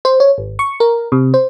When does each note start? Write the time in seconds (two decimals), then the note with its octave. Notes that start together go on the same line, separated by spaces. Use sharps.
0.05 C5
0.20 C#5
0.38 G#1
0.59 C#6
0.80 A#4
1.12 C3
1.34 C5